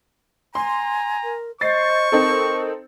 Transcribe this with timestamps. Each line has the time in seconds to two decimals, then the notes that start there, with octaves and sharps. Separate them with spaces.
0.55 G#5 A#5 C6
1.23 A#4
1.61 C5 D#5 C#6 A6 C7
2.12 C4 D#4 A4 A#4